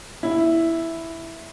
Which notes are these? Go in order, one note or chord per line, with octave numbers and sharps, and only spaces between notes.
E4